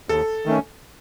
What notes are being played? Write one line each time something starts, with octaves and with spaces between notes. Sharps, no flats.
D#2 A4
D#3 A3 C#4